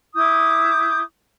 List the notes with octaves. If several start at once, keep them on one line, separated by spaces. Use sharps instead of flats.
E4 D6 D#6 G6